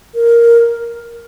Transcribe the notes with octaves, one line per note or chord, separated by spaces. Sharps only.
A#4